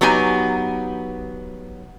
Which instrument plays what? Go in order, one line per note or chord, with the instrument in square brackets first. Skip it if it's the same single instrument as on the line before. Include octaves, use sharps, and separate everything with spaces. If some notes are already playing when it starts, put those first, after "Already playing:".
[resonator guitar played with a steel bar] F#3 B3 D#4 G4 G#5